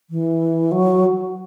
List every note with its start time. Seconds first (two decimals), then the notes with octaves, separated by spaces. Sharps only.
0.10 E3
0.72 F#3